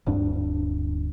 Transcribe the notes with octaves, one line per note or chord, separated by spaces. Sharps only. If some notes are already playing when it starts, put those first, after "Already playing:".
D1 G2 D4